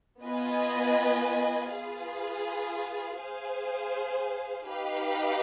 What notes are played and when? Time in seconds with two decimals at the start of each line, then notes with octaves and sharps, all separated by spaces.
0.24 B3 F4 B4 D#5 G#5
1.71 F4 G#4 B4 F5
3.19 G#4 C5 F5 G#5
4.66 D#4 G4 B4 F5